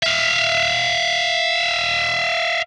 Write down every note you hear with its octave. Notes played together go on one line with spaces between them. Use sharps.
E5 F5